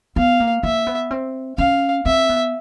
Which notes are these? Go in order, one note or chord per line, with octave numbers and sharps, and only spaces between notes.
B3 F5
A#3
A#3 E5
B3
C4
C#4 F5
C4 E5
B3